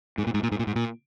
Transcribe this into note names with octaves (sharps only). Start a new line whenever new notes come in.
G#2
A#2
G#2
A#2
G#2
A#2
G#2
A#2